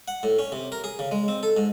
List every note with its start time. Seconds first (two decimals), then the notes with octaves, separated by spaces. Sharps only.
0.08 F#5
0.23 A2
0.39 C#4
0.52 C3
0.72 A#4
0.84 G#4
0.99 C#3
1.12 G#3
1.28 C4
1.43 A4
1.57 G#2